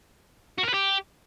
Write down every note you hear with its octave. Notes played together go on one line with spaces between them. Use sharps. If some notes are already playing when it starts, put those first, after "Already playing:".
F#4
A#4
B4
G4